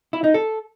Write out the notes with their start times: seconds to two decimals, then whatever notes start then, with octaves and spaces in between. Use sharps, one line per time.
0.13 E4
0.24 D#4
0.34 A4